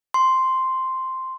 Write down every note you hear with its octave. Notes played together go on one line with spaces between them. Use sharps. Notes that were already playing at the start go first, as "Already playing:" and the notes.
C6